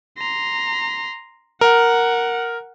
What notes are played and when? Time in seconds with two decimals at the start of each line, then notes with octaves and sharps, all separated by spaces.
0.18 A#5 C6
1.61 A#4 F#5